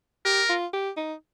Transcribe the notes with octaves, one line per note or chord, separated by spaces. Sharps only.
G4 A#4
F4
G4
D#4